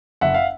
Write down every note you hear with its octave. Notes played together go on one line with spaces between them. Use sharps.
F#1 E5 F#5
F5